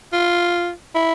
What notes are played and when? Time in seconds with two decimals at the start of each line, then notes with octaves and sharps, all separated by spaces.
0.13 F4
0.95 E4